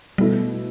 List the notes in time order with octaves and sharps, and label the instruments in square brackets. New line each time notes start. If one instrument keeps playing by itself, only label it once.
[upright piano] B2 A3 E4 [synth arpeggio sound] G3